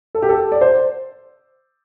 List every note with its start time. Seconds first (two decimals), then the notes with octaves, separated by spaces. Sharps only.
0.15 A4
0.22 G4
0.29 A4
0.52 D5
0.61 C5